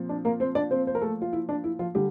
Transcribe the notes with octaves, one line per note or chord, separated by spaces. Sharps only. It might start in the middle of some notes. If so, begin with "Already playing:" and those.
Already playing: A#2 F3 C4
D4
A#3 A#4
C4 C5
D4 D5
C4 C5
C5
A#4
A3 A4
F4
E4
D4
E4
F3 F4
D3 G3 G4